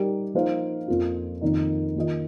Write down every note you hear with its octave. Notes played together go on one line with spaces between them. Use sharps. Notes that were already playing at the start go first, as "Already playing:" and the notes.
Already playing: G3 D#4 G4 A#4
F3 A#3 D#4 C5 F5
F2 F3 A#3 F4
F2 D#3 A#3 D#4
D#3 A#3 F4 D#5